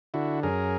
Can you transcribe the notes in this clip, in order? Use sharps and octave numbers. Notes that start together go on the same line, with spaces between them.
D3 E4 F#4
F#2 G#4 A#4